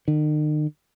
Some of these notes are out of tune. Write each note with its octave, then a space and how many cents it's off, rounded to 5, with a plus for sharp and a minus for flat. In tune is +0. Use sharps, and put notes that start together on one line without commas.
D#3 -45